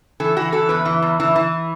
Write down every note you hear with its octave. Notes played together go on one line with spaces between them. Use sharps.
E3 A4
E3 F#4
E3 A4
E2 B4
E3
E2
E3
E3